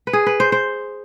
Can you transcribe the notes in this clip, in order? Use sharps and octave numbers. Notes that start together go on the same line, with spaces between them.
B4
G#4
B4
C5
C5